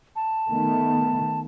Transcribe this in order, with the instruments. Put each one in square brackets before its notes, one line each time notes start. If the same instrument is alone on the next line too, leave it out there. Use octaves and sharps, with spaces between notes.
[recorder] A5
[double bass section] D#3 A3 B3